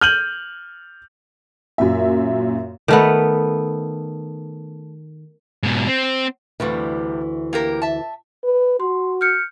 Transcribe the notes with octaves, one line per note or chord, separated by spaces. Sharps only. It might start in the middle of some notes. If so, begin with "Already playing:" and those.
F6 G6 D#7 F#7
F#2 A#2 E5
D#3 A3 B3
G#2 B2
C4
D2 G2 C3 E3 G3
A#3 G4 A#4
E5 A5
B4
F#4 C6
F6 G6 C#7